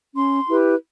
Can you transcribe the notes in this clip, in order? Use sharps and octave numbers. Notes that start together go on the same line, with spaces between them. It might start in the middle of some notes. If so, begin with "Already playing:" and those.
C#4 C6
E4 G4 B4